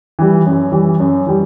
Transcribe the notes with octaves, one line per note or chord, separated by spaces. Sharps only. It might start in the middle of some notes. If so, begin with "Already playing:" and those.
E3 G3
F#2
E3 G3
F#2
E3 G3